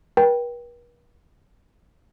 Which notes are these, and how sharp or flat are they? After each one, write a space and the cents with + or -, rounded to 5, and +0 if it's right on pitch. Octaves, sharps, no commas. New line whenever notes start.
B4 -45 G5 +0